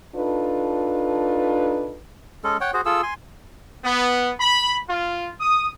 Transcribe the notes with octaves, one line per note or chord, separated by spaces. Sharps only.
D4 D#4 F4 A4 B4
G#3 C#4 A4
C#5 F#5 G5
F#4 G#4 C5
F4 G#4 A4 E6
G#5 C6
B3
B5
F4
D#6